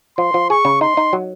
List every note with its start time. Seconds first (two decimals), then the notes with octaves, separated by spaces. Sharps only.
0.18 F3 C6
0.34 F3
0.50 G#4 C#6
0.65 C#3
0.81 D#4 C6
0.97 D#4
1.13 F#3